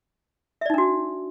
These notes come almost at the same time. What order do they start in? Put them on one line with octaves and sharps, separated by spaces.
E5 D5 D#4 D4 F#4